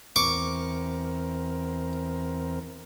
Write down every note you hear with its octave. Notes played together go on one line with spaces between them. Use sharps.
E2 C4 A#4 C#6 D6